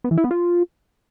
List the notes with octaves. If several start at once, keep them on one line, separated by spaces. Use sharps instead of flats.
B3
E3
E4
B3
F4